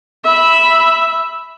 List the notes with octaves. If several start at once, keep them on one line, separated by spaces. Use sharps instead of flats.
E5 B5